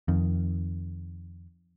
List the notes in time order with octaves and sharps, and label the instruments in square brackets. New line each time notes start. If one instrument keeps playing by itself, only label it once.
[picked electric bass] F2 D#3